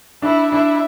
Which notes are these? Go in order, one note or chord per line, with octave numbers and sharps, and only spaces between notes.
D4 E4
D4 E4